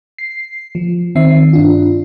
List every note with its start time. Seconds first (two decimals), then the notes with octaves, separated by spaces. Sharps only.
0.18 C7
0.75 F3
1.15 D#3 C4 E5 C7
1.53 G2 D4 F4